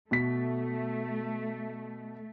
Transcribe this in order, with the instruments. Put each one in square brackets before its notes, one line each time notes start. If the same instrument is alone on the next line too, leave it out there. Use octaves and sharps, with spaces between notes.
[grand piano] B2 B6 [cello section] A3